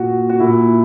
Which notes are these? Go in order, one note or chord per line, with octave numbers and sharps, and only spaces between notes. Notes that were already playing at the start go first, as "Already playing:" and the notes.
Already playing: A#2 F#4
F#4
A#2 E4